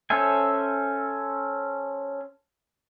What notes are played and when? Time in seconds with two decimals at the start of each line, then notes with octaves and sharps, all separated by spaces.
0.10 C#4 A4 C5 E5 G#5